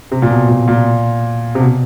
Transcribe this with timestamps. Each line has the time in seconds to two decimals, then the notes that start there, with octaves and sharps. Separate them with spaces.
0.11 C3
0.22 A#2
0.30 B2
0.49 A#2
0.68 A#2
1.55 C3
1.60 B2